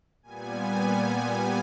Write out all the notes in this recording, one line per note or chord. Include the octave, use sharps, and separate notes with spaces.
A#2 G3 B3 G#5